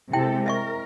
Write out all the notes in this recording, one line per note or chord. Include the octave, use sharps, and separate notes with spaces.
C3 G#3 E4 A4 G5
A#4 D#5 E5 C#6